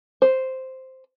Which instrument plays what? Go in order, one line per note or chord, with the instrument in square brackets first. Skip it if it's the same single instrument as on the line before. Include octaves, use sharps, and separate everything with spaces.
[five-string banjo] C5